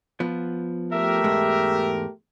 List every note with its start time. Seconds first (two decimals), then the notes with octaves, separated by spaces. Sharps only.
0.20 F3 B3
0.92 A3 G4 A#4 E5
1.24 E2 G#2 G#3